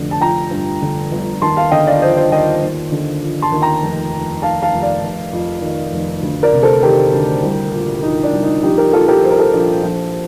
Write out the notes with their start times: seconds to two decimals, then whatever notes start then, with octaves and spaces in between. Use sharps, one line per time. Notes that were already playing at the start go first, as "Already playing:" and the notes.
Already playing: F1 D3
0.11 A5
0.21 F3 G5 A#5
0.51 G2
0.82 D3
1.11 G1
1.42 D#2 A5 C6
1.57 F5 A5
1.71 D3 D#5 G5
1.87 D5 F5
2.02 F3 C5 D#5
2.17 C5 D#5
2.32 D#2 D#5 G5
2.62 D#2
2.92 D3
3.22 F3
3.42 A5 C6
3.52 D#2
3.62 G5 A#5
3.82 F1
4.13 F2
4.42 D#3 F5 A5
4.62 F5 A5
4.72 F1
4.82 D5 F5
5.02 F1
5.33 F2
5.62 D#3
5.92 F1
6.23 D2
6.43 A#4 D5
6.53 C3
6.63 A4 C5
6.83 D#3 G4 A#4
7.13 D2
7.43 C2
7.73 A#2
8.03 F3 D#4
8.23 D4
8.33 C2
8.43 D#4
8.63 A#1 D#4 G4
8.78 G4 A#4
8.93 A#2 F4 A4
9.08 G4 A#4
9.23 F3 C5
9.31 A#4
9.38 A4 C5
9.53 A#1
9.83 A#1